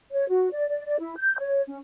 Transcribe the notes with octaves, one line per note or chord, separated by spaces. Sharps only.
C#5
F#4
D5
D5
D5
E4
G6
C#5
C#4